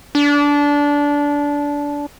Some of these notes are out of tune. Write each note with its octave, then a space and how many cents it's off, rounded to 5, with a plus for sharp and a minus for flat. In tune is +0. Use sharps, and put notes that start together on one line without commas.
D4 -20